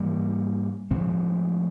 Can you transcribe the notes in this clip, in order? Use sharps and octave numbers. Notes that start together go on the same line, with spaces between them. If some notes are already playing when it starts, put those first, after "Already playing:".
Already playing: G#2 E3 G3 A#3
A2 F3 G#3 C4